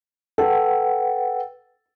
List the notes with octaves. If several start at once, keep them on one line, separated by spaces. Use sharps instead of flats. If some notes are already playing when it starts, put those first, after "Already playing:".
A4 B4 F#5 G5